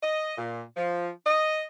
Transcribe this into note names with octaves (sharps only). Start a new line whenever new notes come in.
D#5
A#2
F3
D#5